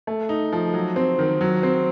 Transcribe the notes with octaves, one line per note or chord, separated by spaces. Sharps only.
A3
D#4
F3
F#3
C4
D#3
F#3
C4